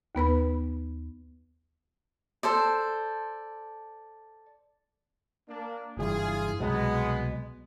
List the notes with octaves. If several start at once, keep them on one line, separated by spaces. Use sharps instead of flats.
D#2 B3 B4 B5
A4 C5 D5
A#3 D4
F#1 G2 E3 F4 G#4
C2 B2 F#3 G#3 B3